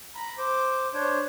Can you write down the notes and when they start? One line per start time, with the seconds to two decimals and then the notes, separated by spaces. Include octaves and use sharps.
0.15 A#5 B5
0.38 C5 D6
0.94 D4 C5 C#5